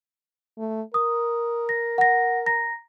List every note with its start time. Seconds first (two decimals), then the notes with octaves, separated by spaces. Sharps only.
0.58 A3
0.94 A#4 D#6
1.69 A#6
1.98 F#5 A#6
2.46 A#5 A#6